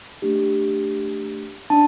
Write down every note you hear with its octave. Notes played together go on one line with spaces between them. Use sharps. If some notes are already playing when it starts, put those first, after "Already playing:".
A3 D4 G4
D4 A5